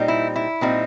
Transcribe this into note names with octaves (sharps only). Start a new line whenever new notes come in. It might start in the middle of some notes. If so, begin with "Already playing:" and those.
Already playing: A#2 G3 C4 D#4
E4
E4
A#2 G3 C4 D#4